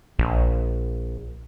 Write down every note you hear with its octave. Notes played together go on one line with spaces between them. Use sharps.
A#1